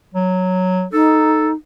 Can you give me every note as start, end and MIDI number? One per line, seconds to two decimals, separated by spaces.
0.14 0.85 54
0.93 1.52 63
0.93 1.50 69